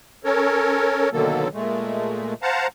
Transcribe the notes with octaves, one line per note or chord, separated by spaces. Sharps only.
C#4 A4 A#4 C#5
B2 D3 D#3 F#3 A#3 A4
A#2 G#3 A3
C5 F5 F#5 A5 A#5